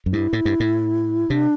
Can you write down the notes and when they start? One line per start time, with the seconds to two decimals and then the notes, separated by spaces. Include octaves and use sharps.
0.06 F#2
0.12 G2 E4
0.33 A2
0.45 G2
0.60 A2
1.30 C3 D4